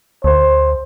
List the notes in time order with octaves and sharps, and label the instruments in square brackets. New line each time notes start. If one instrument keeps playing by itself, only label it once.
[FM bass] D2 [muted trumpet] C5